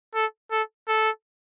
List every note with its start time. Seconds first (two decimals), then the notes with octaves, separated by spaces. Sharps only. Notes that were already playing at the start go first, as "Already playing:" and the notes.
0.15 A4
0.51 A4
0.88 A4